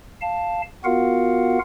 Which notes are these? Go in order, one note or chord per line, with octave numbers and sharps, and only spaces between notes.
F5 A5
B3 F4 F#4 A#4 F5 F#5